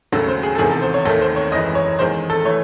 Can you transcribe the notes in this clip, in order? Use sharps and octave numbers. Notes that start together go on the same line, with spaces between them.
D#2 C#3 F#3 A3 A4
C5
G#4
A4
E1 E2 C3 D#3 G#4
A4
C5
C#5
D#2 D#3 A3 A4
C5
C#5
F#1 F#2 E3 G#3 D#5
C#5
E2 D#3 G#3 C5
A4
E3 A3 C#5